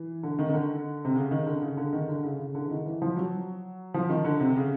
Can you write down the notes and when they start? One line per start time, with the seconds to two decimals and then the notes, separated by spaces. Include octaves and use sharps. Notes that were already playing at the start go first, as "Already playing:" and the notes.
Already playing: E3
0.23 D3
0.39 D#3
0.49 D#3
0.54 D3
1.05 C3
1.16 C#3
1.31 D#3
1.47 D3
1.62 C#3
1.77 D3
1.93 D#3
2.08 D3
2.24 C#3
2.39 C#3
2.55 D3
2.65 E3
2.71 D#3
2.86 E3
3.02 F3
3.16 F#3
3.94 F3
4.09 D#3
4.24 D3
4.40 C3
4.56 C#3